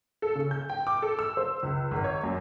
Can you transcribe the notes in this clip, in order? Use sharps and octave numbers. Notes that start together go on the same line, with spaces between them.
A4
C#3
G6
G5
D6
A4
E6
C5
C#2
G#1
C#5
F#2